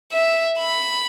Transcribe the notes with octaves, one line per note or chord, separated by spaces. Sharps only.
E5
B5